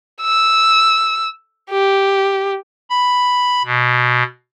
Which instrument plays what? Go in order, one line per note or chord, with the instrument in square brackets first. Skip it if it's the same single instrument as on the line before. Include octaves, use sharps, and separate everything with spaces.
[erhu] E6
G4
[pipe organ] B5
B2